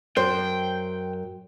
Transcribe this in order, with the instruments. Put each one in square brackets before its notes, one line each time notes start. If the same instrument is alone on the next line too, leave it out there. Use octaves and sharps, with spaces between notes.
[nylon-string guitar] F#2 [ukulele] C5 [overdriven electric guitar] G5